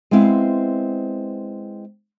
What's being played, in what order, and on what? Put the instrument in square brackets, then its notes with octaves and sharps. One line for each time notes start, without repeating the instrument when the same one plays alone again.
[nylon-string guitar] G#3 B3 C4 E4 F5